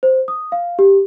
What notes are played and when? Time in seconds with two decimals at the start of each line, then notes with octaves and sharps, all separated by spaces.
0.03 C5
0.28 D#6
0.52 F5
0.79 G4